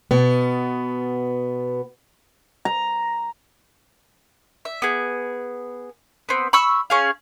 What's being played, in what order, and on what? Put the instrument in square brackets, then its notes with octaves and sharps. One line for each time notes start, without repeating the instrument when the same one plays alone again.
[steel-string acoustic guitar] B2 B3
[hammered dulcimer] A#5
[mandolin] E5
B3 G#4
B3 C4
B5 C#6 E6
C#4 G#4 F5